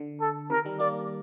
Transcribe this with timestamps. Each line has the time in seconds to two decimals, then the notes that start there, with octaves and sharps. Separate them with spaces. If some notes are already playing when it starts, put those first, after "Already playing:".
Already playing: D3
0.21 A4
0.50 C3 D#3 A#4
0.65 D#3 G3
0.80 G3 A#3 D5